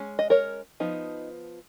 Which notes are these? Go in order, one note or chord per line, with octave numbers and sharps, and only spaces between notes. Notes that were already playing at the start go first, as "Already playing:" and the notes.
Already playing: G#3 C#4
D#5
A#4 C#5
F3 B3 D#4